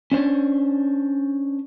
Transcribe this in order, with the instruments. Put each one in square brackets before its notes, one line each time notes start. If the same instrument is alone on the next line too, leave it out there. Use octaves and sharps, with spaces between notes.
[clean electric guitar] C#4 D4 C5 C#5